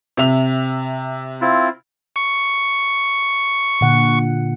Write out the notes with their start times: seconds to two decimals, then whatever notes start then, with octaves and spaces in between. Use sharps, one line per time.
0.17 C3 E5 F7
1.41 C4 E4 F4
2.16 C#6
3.81 A#2 D3 F#5